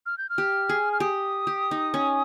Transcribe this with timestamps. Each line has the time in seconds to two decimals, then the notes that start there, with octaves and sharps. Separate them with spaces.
0.06 F6
0.18 G6
0.29 F6
0.38 G4
0.69 G#4
0.93 F6
1.00 G4 D#6
1.47 G4
1.71 D#4
1.94 C#4